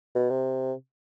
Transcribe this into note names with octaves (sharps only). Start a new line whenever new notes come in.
B2
C3